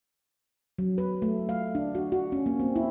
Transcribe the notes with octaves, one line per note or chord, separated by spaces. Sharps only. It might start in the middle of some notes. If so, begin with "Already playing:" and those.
F#3
B4
A3
F5
D4
F#4
F#4
C#4
A#3
C4
E4